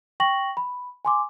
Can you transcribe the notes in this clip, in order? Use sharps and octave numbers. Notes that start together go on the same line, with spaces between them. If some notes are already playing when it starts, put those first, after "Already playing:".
G5 C#6 A#6 F#7
B5
G#5 C6 D6